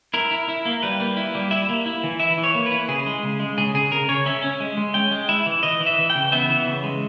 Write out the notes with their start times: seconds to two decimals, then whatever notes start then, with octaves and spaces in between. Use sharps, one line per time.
0.14 E4 A#4
0.31 E4
0.48 E4
0.65 A#3
0.83 G3 B4
1.00 A#3
1.17 E4
1.35 G3
1.51 E4 E5
1.69 A#3
1.86 E4
2.03 E3
2.20 E4 E5
2.38 E3
2.44 C#5
2.55 A#3
2.66 B4
2.72 E4
2.88 C#3 G#4
3.06 G#3
3.23 C#3
3.40 G#3
3.58 C#3 G#4
3.74 C#3 G#4
3.92 C#3 A#4
4.08 C#3 C#5
4.26 C#4 E5
4.43 C#4
4.60 G#3
4.77 G#3
4.94 C#4 G5
5.11 G#3
5.29 E4 E5
5.46 E3
5.63 E3 D#5
5.80 E3
5.86 E5
5.98 E3
6.10 G5
6.15 C#3
6.32 B3 E5
6.49 E3
6.66 C#3
6.84 G#3